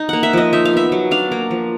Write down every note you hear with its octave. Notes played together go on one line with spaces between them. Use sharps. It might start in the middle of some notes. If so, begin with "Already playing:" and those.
Already playing: D#4
A#3 F#5
E5
F3 D#5
D#4 E5
F5
B3 E5
F#3
D4 F5
A#3
F3